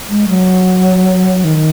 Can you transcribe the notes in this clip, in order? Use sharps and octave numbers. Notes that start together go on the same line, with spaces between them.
G#3
F#3
D#3